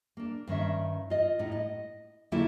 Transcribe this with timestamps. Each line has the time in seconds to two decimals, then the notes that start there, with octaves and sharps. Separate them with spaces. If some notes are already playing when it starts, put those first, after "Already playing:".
0.17 A#3 D4
0.47 G2 D#3 C#4 E5
1.10 F4 D#5
1.39 A2 D#4
1.52 D#5
2.32 D3 F#3 A#3 E4 F4 A4